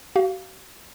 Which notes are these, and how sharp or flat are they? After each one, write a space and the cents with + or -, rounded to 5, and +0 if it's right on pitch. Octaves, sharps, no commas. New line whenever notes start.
F#4 +40 F5 +0